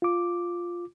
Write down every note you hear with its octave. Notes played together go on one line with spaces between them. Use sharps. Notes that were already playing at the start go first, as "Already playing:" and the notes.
F4 D6